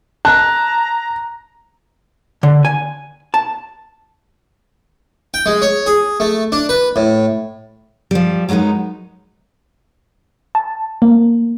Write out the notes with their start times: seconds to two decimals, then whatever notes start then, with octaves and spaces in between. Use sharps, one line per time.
0.25 A5 A#5 F#6
2.43 D3
2.65 G#5
3.34 A5
5.34 G5
5.46 G#3
5.62 C#5
5.86 G#4
6.20 A3
6.52 D4
6.69 B4
6.96 A2
8.11 F3 G3
8.49 F#3 G#3 B3 D#4 A#4
10.55 A5
11.02 A#3